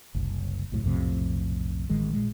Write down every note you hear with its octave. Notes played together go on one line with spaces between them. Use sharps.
F#1 C2
C2 F#2 A2
B1 F2 A2 C3
A1 D#3 G#3
A#2 G#3